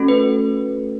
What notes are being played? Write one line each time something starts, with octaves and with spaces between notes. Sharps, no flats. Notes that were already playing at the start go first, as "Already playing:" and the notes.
Already playing: A3 C#4 F#4 A4
B4